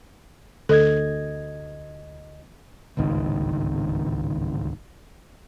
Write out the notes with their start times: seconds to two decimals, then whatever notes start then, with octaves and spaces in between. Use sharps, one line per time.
0.69 D2 A4 D#5 G#6
2.97 D1 G#1 C#2 D#3